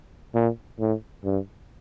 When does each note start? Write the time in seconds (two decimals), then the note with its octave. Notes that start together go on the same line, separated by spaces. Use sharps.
0.34 A#2
0.79 A2
1.24 G2